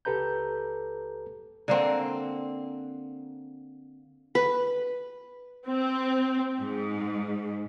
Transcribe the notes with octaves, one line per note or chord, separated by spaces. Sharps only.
C#2 G4 A4 B4 A#5 G6
D3 A#3 C4
B4
C4
G#2